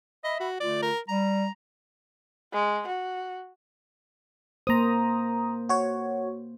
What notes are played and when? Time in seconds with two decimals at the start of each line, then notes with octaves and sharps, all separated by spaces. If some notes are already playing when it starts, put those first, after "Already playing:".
0.24 D#5 E5 B5
0.40 F#4
0.61 D3 A3 F4 D5
0.83 A#4
1.08 G3 A#5
2.53 G#3
2.87 F#4
4.67 A#3 C5 A#5 D#6
5.69 F#4 C#5